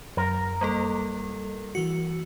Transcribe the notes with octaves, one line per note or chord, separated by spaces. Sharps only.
F#2 A#4
G3 A#3 A4
E3 F#4 C#7